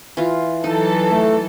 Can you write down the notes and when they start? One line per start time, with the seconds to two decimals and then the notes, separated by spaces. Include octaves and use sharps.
0.17 E3 F4
0.64 E3 F#3 D#4 A4
1.11 A3